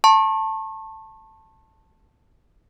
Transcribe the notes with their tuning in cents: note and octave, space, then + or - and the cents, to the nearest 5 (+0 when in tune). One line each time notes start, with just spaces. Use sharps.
A5 +10 C#6 -40